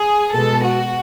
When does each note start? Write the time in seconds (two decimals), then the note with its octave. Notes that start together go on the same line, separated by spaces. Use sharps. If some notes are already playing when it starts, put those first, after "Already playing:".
Already playing: G#4
0.34 B2 G#3 B3 A4
0.64 F#4